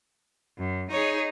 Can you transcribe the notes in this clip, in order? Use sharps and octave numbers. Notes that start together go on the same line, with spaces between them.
F#2
D#4 G#4 C#5